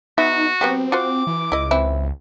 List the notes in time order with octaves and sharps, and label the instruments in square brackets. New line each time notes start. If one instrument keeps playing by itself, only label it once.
[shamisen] B3 E5 [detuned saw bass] D#4 [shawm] F#4
[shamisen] F#3 B3 G4 [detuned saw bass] C4
[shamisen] F4 F#4 C5 [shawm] D6
[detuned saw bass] E3
[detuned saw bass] C#2 [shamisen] E4 D#5
[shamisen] E3 C4 E4